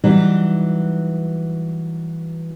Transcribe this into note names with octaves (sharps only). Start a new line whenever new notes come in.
E3 F#3 G3 D#4